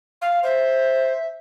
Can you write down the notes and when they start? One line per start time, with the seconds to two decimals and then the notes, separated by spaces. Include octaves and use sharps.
0.22 F5
0.43 C5 E5